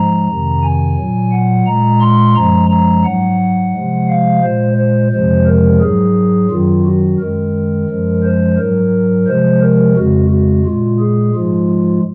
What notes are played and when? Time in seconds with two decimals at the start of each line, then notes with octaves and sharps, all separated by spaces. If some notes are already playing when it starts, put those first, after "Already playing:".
Already playing: G#2 F3 G#3 A#5
0.28 F2 C3 D#3
0.63 G#5
0.97 A#2 F#3
1.32 F#5
1.66 A#2 G#3 A#5
2.01 C6
2.35 F#2 F3 G#3 A#5
2.70 A#5
3.05 G#2 F#3 F#5
3.74 C3 F3 G#3
4.08 F5
4.43 A#2 G#3 C5
4.77 C5
5.12 F2 C3 F3 G#3 C5
5.46 A#4
5.81 G#2 F#3 G#4
6.50 F#2 D#3 F#3 F4
6.85 F#4
7.19 F#2 D#3 G#3 A#4
7.89 F#2 F3 G#3
8.23 C5
8.58 G#2 F#3 A#4
9.27 C3 F3 G#3 C5
9.62 A#4
9.96 F2 C#3 G#3 F#4
10.31 F#4
10.65 A#2 G#3 F4
11.00 G#4
11.34 G#2 F3 G#3 F4